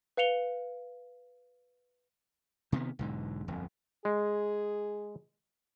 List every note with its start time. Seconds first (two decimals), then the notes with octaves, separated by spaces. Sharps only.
0.17 B4 F5 C#7 F7 G7
2.72 C3 D#3 G#3 B3
2.99 B1 G#2 D3
3.48 D1 G1 F2
4.05 G#3 G#4